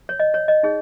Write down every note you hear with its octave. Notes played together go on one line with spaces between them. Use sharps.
C#5
D#5
C#5
D#5
D#4 G#4 C#5